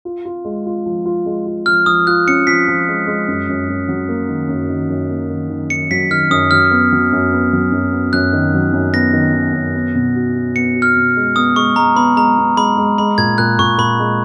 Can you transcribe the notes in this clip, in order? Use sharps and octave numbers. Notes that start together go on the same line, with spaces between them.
F4
F4
G#3
F4
F3
F4
G#3
F4
F3 F6
F3 D#6
F4 F#6
C#4 C#7
F3 B6
F3
G#3
G#3
F#2
F#2
F#2
F#3
A#3
D#3
F#2
D#3
F#2
A#3
D#3
D#3
D#3 C#7
F#3 B6
D#3 F6
F#2 D#6
F#3 F6
B3
F#3
F#2
B3
F#3
F#2
B3
F#2 F#6
D#3
F#3
F#2
B3 A#6
D#3
D#3
F#2
B3
B2
F#4
F#4
B3 C#7
F#4
F6
B2
G#3
B3 D#6
G#3 C#6
G#3 A#5
B3 B5
G#3 A#5
B3
G#3 B5
G#3
G#3 B5
A#2 G#6
A#2 F#6
A#2 C#6
A#2 B5
G#3